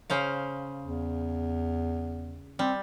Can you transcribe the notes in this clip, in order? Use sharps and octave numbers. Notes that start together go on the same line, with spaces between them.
C#3 C5 F5
E2
G3 C4